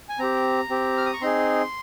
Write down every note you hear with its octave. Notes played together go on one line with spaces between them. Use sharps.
G#5
C4 G4 A#5
C4 G4
F6
D#6
C#6
C4 D#4 G#4 C6